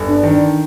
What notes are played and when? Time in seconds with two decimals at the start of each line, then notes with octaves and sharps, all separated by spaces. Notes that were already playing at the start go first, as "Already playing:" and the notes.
Already playing: G1
0.09 D4
0.23 D#3
0.31 D4